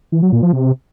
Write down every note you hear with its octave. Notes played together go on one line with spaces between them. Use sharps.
E3
F#3
A#2
F3
C3